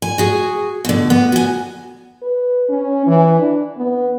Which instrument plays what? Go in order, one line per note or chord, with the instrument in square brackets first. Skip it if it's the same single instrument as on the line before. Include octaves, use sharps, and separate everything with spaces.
[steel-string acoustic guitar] G#5
F#4 G#4
B2 D3
B3
F#4 G#5
[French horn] B4
C#4
E3
D4
B3